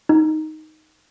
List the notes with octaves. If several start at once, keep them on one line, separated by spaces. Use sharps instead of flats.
D#4